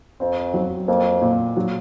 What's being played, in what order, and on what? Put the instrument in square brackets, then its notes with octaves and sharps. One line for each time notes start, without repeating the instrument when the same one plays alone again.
[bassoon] F2 [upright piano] C4
[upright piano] F#3
[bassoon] F2 [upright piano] A#3
[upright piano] A#2
F#3